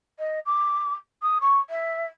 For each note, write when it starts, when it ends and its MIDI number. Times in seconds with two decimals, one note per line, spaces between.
0.18 0.39 75
0.45 0.94 86
1.22 1.38 87
1.41 1.59 85
1.69 2.05 76